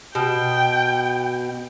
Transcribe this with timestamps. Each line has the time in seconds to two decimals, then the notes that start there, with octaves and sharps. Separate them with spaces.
0.15 B2 G5